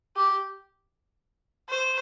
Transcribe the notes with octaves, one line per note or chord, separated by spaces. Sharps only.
G4
C5